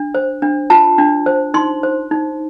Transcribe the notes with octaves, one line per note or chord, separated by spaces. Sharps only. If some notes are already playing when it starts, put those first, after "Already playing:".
Already playing: D4
C5
D4
F4 A5
D4
C5
D#4 C6
C5
D#4